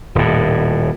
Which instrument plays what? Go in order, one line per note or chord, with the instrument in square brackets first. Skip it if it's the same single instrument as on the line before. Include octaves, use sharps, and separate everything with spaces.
[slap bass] D#1 A2